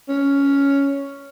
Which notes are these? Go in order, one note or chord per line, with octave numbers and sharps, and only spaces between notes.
C#4